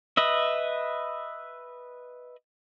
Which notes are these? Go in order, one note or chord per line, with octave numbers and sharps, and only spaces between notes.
B4 D#5 E5